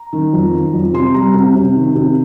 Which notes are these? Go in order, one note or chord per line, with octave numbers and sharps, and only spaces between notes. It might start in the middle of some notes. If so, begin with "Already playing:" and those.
Already playing: A#5
D#3
F2
D#3
F2
C3 C6
G3 A#5
C3
C3
D#3
C3